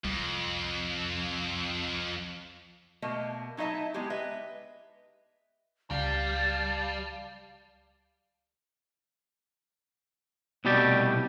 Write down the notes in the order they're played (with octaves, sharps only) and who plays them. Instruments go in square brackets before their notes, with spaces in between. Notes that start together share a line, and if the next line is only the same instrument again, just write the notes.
[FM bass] C2 [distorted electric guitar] F2
[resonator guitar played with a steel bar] B2 A3 A#3 D#5
F#3 D#4 E4 D#5 E5 A5
G#3 B3 G4
B4 D#5 E5
[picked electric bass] C#2 [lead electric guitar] G3 [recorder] F5 [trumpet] A5
[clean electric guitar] C2 B2 G3 A3 G4 D5